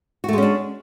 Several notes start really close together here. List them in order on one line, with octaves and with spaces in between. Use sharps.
F#4 A3 G#3 C#4 D4